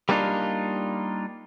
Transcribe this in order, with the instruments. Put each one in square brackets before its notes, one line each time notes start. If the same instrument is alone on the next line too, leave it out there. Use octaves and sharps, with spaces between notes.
[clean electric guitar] G3 A#3 B3 D4 D#4 F4